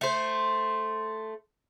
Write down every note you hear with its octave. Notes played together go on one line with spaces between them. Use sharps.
A3 C5